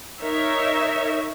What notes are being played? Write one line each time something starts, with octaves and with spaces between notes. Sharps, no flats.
D#4 A#4 C#5 E5